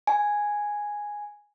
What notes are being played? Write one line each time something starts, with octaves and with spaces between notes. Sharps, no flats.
G#5